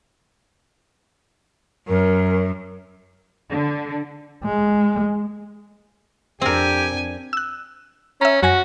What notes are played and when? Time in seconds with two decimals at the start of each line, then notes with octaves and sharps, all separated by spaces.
1.88 F#2 A#4
3.50 D3
4.44 G#3
6.41 F2 C4 D4 G4 A#4 G#5
7.33 E6 F#6
8.21 C#4 E5 A#5
8.43 F#2 F#4 G#5 A#6